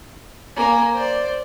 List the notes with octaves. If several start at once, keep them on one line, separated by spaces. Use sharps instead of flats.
A#3 G#5
C5 D5